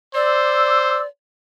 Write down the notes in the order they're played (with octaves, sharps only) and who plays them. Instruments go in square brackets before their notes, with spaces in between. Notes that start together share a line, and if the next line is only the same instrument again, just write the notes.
[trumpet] C5 [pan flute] D5 [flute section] D6 E6